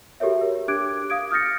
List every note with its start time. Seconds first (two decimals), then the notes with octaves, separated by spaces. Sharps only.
0.20 F#4 G4 A4 A#4 C#5 E5
0.41 A#4
0.68 D4 G4 D6 F#6 G#6 D7
1.10 F5 D#6 G#6 D7
1.31 D#6 F6 G6 A6 A#6 C#7